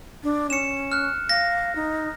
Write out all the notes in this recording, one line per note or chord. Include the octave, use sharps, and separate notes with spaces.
D4
C#4 C#7 E7
F6 F#6
F5 A#6
D#4